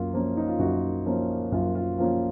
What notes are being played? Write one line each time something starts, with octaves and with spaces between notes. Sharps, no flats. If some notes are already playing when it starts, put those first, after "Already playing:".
Already playing: F#2 A#3 F4
F3 A#3 C#4
D#4
F4
F#2 F#4
F3 A#3 C#4
F#2 F4
F4
F3 A#3 C#4 F4